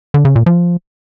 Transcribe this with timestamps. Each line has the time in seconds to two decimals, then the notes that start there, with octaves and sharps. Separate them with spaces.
0.14 D3
0.25 C#3
0.36 A#2
0.46 F3